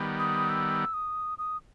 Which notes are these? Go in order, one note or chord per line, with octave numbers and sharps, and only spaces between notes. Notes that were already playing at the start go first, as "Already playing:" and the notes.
Already playing: D#3 G3 B3
D#6
E6
D#6
D#6